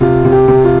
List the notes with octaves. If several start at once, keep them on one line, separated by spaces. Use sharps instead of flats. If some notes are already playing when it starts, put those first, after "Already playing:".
C3 F4
C3
G4
C3
F4